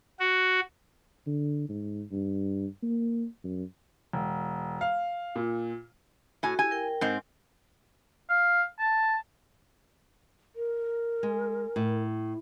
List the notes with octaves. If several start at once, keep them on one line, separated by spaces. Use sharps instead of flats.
F#4
D3
G#2
G2
A#3
F#2
E1
F5
A#2
A2 F#4 G#5
E4 G4 G#5
A#4 G5
G#2 C4
F5
A5
A#4
G#3
A2